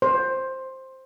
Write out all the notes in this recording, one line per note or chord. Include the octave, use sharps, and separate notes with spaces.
C5